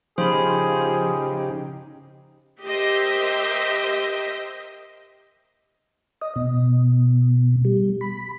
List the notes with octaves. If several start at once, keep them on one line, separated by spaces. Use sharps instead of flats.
C#3 F3 D#4 G4 G#4 C5 B5
G4 A#4 C5 D#5 E5
D#5
B2
G3
B5